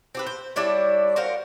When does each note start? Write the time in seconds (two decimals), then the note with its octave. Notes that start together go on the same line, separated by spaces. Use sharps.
0.15 C4 G4 B4
0.27 C5
0.56 G3 D4 E4 C#5
1.16 F#4 A#4 C5 F5